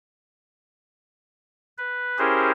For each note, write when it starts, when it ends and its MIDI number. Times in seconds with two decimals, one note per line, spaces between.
1.78 2.18 71
2.19 2.52 61
2.19 2.52 64
2.19 2.52 67
2.19 2.52 68
2.19 2.52 70
2.19 2.52 72